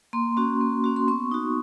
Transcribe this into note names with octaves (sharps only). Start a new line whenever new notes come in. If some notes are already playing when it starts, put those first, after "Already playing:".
A#3 C6
C#4 F#4
A#3
C#4 F#4
C6
B3 C#6
D#4 F#4